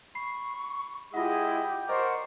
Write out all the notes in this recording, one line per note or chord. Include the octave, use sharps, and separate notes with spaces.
B5 C#6 C7
G#3 E4 F4 G4 G#4 D#5 F#5
A#4 C5 D5 D#5 F#5 C#6